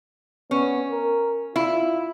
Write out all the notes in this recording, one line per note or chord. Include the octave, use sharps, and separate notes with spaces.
B3 C#4
A#4
E4 F4